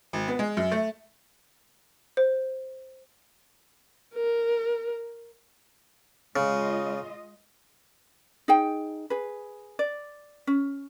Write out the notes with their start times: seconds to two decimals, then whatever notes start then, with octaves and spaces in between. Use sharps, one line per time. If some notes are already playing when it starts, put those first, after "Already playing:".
0.13 G#1
0.28 B3
0.39 G#3
0.57 F#2
0.71 A3
2.17 C5
4.15 A#4
6.36 C#3 G#3 F4 D#5
8.48 D#4 G#4 G5
9.10 G#4 B4
9.79 D5
10.47 C#4